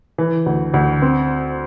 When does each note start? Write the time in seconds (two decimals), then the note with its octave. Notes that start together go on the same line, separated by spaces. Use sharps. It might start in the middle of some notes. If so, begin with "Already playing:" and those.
0.18 E3
0.46 D2
0.74 D2
1.02 C4